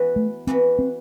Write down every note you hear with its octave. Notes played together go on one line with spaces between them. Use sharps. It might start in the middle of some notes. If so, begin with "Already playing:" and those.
Already playing: E3 B3 F#4 B4
A3
E3 B3 C4 F#4 B4
C4